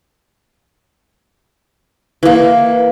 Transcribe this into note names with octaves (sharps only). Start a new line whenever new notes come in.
E3 A#3